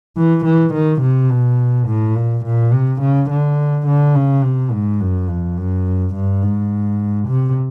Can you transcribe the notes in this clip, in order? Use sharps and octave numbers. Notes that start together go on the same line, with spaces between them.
E3
E3
D#3
C3
B2
A2
A#2
A#2
C3
C#3
D3
D3
C#3
C3
G#2
F#2
F2
F#2
G2
G#2
C3